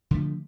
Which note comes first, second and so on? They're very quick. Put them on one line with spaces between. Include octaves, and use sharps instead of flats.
D3 A3 F3